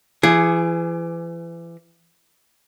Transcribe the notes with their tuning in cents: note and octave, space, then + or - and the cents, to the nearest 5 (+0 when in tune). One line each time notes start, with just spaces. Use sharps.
E3 +35 G#4 +0